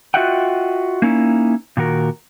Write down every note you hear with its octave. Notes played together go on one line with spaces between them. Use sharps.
F4 F#4 D#5 E5 F#5 G5
A#3 C#4 D#4 E4
A#2 D#3 F#4 A#4